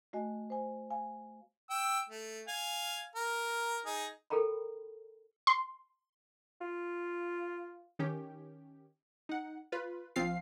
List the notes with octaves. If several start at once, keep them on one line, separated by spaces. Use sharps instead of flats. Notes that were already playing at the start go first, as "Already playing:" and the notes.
A3 F#4 D#5 G#5
C5 G#5
F5 G#5
G5 E6
A3
F5 G#5
A#4
D#4 G#4
A4 A#4 G5 A#5 B5
C6
F4
D#3 C#4 G4
D#4 F#5
F4 B4
A#1 F3 C4 F4 F5 C7